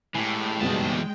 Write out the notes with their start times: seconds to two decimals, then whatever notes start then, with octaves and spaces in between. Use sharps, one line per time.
0.15 A2 E3 G#3 G4 G5 G#5
0.61 F#1 G2 B2 E3 B3 D#4 A5